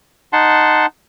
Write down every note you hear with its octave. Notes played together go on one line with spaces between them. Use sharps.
D#4 F#5 A5 C6